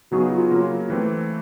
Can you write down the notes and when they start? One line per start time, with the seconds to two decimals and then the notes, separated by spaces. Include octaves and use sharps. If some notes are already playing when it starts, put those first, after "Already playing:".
0.11 C#3 F#3 B3 D#4 F#4 G#4
0.31 F4
0.51 C#3 F#3 A#3
0.90 E3 A3 C4